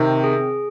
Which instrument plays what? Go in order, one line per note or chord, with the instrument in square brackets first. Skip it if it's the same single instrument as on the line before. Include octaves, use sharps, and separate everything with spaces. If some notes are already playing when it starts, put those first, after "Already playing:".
Already playing: [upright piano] C3 D#3 [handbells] C4
[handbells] G#4